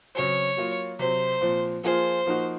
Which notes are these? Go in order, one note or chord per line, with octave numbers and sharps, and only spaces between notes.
C#3 F#3 C4 C#5
F#3 A#3 F4
C3 F#3 C4 C5
A#2 F3 C4
F3 A#3 F4 G#4 C5
F3 A#3 D#4 F#4